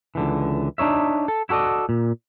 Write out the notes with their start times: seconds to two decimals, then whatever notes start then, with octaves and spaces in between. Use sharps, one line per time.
0.15 C#2 D3 E3
0.78 D4 D#4 C#5 E5
1.28 A4
1.49 E4 F#4 A4 D5 D#5
1.89 A#2